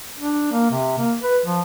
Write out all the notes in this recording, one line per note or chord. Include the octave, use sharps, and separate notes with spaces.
D4
A#3
C3
A#3
B4
F3